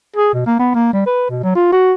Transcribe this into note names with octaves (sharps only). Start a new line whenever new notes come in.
G#4
B2
A#3
B3
A#3
G3
B4
B2
F#3
F4
F#4